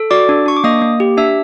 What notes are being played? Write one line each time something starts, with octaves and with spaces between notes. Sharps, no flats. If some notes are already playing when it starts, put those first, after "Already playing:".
Already playing: A4
F#4 D5 D6
D4
D4 C#6
D6
A#3 D#5 D#6
A#3
G4
D4 E5 E6